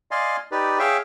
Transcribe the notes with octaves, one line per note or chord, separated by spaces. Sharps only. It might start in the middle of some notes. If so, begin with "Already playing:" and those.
D5 D#5 F5 G#5 C6
D#4 G4 B4 D5
G#4 C#5 E5 F5 G5